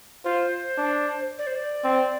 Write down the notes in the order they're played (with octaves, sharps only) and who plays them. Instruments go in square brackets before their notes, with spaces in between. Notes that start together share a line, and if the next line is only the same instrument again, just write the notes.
[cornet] F4 [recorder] C5
[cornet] D4
[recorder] D5
C5
D5
[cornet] C4